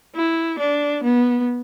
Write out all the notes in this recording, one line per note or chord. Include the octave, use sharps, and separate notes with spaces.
E4
D4
B3